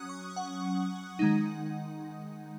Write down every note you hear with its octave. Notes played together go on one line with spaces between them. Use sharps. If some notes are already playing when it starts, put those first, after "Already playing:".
Already playing: F#3 C#4 D#6 F#6
C#6
F#5
D#3 G#3 D#4